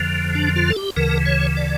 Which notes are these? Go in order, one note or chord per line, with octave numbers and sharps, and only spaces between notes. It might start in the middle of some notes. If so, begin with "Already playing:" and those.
Already playing: F2 D3 F3
D4
F4
A4
G4
D2 C#3 E3 A#4
C#5
D5